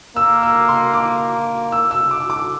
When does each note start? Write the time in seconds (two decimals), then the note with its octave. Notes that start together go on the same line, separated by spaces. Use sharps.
0.16 A#3 E6
0.43 E6
0.69 C6
0.94 D6
1.72 E6
1.91 E6
2.11 D6
2.30 D6